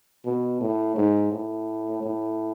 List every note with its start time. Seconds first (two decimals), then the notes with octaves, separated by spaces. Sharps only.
0.25 B2
0.61 A2
0.96 G#2
1.32 A2
2.03 A2